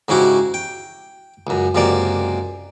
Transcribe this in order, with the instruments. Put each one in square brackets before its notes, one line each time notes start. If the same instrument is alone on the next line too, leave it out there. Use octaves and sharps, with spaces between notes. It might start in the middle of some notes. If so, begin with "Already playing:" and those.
[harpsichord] G#2 C#3 C#4 E4 F#4 G4
G5
C#2 F#2
C#2 F#2 C3 A#3 D5